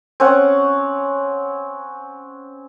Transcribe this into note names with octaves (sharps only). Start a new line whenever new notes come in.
C4 C#4 C#5 F#5